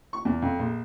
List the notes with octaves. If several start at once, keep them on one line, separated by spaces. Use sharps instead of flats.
C#6
E2
F2
A#1